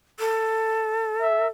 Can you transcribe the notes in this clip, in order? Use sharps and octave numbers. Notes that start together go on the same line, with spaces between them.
A4
E5